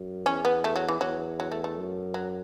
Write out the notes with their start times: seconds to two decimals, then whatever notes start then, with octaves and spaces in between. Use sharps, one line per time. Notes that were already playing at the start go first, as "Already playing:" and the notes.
Already playing: F#2
0.26 E2 C#4
0.45 B3
0.64 A3
0.76 F#3
0.88 E3
1.01 E2 F#3
1.40 F#3
1.52 A3
1.64 A3
1.77 F#2
2.14 F#3